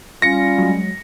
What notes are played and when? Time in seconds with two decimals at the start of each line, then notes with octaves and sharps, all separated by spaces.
0.22 G3 C#4 F4 A#6 C#7
0.58 F#3 G#3